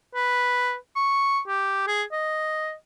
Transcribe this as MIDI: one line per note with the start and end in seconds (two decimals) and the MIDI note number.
0.15 0.75 71
0.96 1.39 85
1.47 1.86 67
1.87 2.03 68
2.12 2.73 75